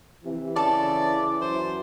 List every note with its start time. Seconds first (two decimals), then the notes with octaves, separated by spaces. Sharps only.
0.24 C3 E3
0.56 C#3 A4 D5
1.42 F#2 C5